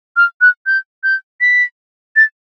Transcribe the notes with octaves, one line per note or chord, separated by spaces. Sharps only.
F6
F#6
G6
G6
B6
A6